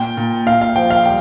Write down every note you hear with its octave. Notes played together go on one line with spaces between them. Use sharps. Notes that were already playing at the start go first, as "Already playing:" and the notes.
Already playing: A#2 G5
A#2
A#2 F5
F5
F3 G5
F5
G3 G5